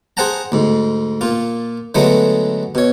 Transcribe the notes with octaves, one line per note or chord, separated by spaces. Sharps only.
G#4 C5 F#5 G5 A5 A#5
D2 G#2
A#2 F4
D3 F#3 G#3 A3 B3
B2 C#5